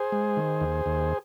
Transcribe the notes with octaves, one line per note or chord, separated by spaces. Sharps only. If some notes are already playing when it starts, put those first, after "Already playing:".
Already playing: G#4 C5
G#3
D#3
D#2
D#2